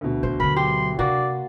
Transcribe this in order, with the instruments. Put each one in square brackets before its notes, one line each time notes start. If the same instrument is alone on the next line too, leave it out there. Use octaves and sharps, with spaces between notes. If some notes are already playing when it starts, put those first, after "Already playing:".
[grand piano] D2 B2
[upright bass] A#2 E3 [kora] C5
[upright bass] D3 F#3 [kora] A#4 [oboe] B5
[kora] G4 [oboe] C6
[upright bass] C3 D4 [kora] A#3 F#4 [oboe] D5